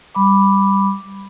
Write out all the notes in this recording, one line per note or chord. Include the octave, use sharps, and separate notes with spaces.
G3 B5 D6